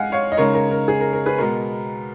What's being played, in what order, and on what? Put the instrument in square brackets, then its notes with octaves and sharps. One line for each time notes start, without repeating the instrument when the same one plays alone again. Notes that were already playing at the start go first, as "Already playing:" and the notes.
Already playing: [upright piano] G#2 G#3 D#4 F5 F#5 G#5
C#5 F5
D#5
C#3 G#3 D#4 A#4 C#5
A#4
A#4
G#4
A#4
A#4
G#4 B4
B2 G#3 B3 A#4